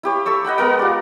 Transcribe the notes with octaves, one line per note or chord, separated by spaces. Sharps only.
E4 G4 C#5
A4 E5 C#6 E6
D#5 F#5 G5 B5
G#3 B3 A#4 F#5
F4 G4 D5